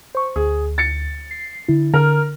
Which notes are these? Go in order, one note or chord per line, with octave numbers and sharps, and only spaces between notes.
C5 C#6
D2 G#4
A6 C#7
C7
D3 E4
D3 A#4 F6